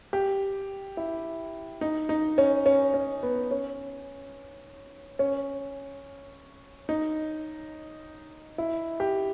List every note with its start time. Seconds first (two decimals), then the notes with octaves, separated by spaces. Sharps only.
0.13 G4
0.97 E4
1.81 D#4
2.09 D#4
2.38 C#4
2.66 C#4
2.94 C#4
3.23 B3
3.51 C#4
5.19 C#4
6.89 D#4
8.58 E4
9.00 G4